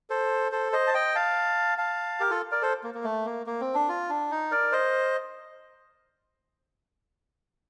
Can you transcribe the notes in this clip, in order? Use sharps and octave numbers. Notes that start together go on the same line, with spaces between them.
A4 C5
A4 C5
C5 D#5
A5
D#5 G5
F5 A5
F5 A5
G4 A#4
F4 A4
A#4 D5
A4 C5
A#3
A#3
A3
A#3
A#3
C4
D4
F4
D4
D#4
A#4 D5
C5 D#5